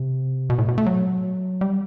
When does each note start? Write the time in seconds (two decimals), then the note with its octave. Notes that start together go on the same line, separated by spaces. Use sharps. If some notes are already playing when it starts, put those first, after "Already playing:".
Already playing: C3
0.50 B2
0.58 A2
0.68 B2
0.78 A3
0.86 F#3
1.61 G3